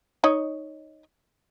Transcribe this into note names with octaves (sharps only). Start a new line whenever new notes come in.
D#4 C#5 D#5